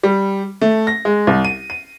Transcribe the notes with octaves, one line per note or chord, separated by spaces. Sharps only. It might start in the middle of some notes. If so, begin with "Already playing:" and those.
G3
A3
A#6
G#3
C2
D#7
D#7